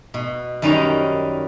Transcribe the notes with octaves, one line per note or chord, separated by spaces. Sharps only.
B2
F#2 D#3 G3 C#4 D#4 A#5